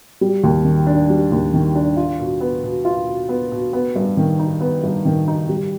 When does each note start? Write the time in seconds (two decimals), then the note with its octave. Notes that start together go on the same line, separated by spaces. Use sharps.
0.21 G3
0.44 D#2
0.65 D#3
0.87 D4
1.10 G3
1.32 D#2
1.54 D#3
1.75 D4
1.97 F4
2.19 B2
2.41 B3
2.64 B2
2.85 F4
3.07 B2
3.29 B3
3.52 B2
3.73 B3
3.96 G2
4.17 D#3
4.39 D#4
4.61 B3
4.83 G2
5.05 D#3
5.28 D#4
5.49 G3